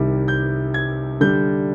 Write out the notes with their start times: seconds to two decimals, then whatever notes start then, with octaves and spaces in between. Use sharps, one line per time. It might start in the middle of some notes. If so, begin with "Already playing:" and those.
Already playing: C2 C3 D#3 G3
0.28 G6
0.74 G#6
1.21 D3 G3 D4 G6